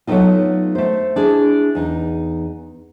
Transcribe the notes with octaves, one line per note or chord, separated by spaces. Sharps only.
F#3 A3 B3 C4 D#4 F4
A3 C5
D4 E4 G#4
E2 D#4